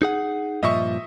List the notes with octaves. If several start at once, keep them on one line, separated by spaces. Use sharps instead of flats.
D#4 G#4 F#5
G2 A#2 F3 D#5 E5 C#6